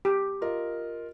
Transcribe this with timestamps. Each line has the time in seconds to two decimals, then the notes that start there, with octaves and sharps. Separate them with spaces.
0.05 G4
0.41 F4 A#4 D#5